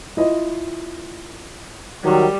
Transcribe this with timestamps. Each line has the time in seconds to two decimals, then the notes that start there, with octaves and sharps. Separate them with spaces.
0.17 E4 F4 D#5
2.04 D#3 F#3 G3